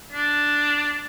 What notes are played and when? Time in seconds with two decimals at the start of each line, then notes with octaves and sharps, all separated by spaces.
0.12 D4